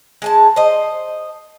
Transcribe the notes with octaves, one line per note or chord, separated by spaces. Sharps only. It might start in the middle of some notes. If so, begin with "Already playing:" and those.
G#3 G#5 A5
C5 D#5